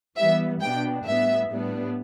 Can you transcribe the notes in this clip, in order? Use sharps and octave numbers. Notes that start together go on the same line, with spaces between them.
E3 G3 B3 E5
B2 B3 D4 G5
A2 G3 B3 E5
A2 G3 B3 D4